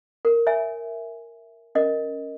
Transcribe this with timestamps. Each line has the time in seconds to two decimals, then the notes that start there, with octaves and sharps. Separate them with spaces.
0.25 A#4
0.47 C#5 E5 G#5
1.75 C#4 A#4 D#5